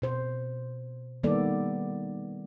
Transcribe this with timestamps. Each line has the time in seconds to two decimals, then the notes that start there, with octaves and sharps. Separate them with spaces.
0.02 B2 C5
1.23 D#3 G3 A#3 B3 A4 D5